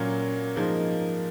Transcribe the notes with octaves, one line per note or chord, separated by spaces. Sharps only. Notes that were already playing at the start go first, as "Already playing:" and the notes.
Already playing: A#2 F#3 A#3 C#4
G#2 F3 A#3 D#4 G#4